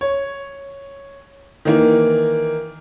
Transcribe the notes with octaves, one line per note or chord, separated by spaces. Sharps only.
C#5
D#3 E3 A#3